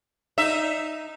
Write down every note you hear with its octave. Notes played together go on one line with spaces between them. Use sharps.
D#4 E5